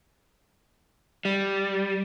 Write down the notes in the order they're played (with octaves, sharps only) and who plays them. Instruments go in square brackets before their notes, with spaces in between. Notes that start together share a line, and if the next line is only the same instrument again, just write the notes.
[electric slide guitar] G3